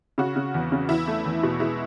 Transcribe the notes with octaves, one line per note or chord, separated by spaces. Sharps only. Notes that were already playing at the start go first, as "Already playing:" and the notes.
C#3 F#4
C#3
E2
C#3
E2 E4
A3
E2
B2
G#3 E4